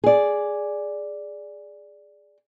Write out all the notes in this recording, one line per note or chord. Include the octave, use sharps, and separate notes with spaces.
G#4 D5